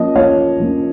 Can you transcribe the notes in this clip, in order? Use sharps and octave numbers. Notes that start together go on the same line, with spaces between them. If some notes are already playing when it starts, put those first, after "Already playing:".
Already playing: F3 A#3 C#4 D#5
F3 A#3 C#4 C#5 F5
F3 A#3 C#4